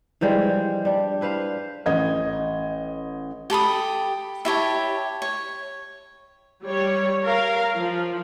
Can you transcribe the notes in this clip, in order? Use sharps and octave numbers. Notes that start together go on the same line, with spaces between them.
E3 F3 G3 G#3
G3 D4
E4 B4 C5 F5
A1 D#5 G#6
G4 A4 B5 D#6
E4 G4 C#5 A5
C#5
G3 C#5
A#4 F5
F3